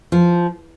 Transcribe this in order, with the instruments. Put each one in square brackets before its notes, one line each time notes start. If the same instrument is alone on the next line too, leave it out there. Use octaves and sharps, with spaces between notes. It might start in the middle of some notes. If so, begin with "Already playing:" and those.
[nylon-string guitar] F3